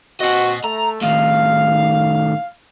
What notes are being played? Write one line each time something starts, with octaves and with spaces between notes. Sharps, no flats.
C4 F#4 D#5 F#5
A3 A#5
A2 D#3 F5